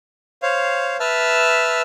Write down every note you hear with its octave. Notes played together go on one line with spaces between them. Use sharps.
C5 C#5 F5
B4 E5 A5 E6 F6